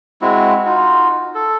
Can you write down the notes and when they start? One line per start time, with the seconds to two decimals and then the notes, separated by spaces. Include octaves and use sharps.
0.22 G#3 C4 E4 F#4
0.66 D#4 F4 F#4
1.35 A4